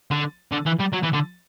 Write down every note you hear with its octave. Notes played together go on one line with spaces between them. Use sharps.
D3
D3
E3
G3
F#3
E3
D3